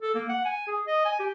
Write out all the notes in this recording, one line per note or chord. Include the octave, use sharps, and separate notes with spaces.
A4
A#3
F#5
G#5
G#4
D#5
G#5
G4